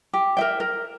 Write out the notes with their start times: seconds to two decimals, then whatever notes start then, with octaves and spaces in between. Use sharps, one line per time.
0.13 G4
0.37 A#4 E5 G5
0.60 A#4